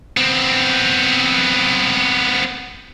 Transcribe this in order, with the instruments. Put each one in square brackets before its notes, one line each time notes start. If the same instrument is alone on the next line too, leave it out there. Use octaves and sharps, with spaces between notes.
[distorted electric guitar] B3 C4